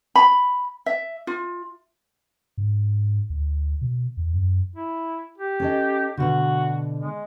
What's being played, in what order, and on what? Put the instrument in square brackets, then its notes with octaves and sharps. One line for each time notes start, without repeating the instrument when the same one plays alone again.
[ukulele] B5
E5
F4
[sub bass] G#2
D2
B2
E2
F#2
[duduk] E4
G4
[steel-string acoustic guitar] C#4 A4 D#5
[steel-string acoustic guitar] B2 D3 [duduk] F#4
[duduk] G#3